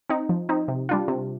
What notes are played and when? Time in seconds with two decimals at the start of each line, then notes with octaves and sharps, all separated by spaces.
0.10 C4 D#4
0.29 F3
0.49 C4 D#4
0.68 C3
0.89 G3 D4 F4
1.08 C3